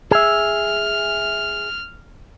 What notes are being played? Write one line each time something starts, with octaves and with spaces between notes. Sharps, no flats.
G#4 E5 F6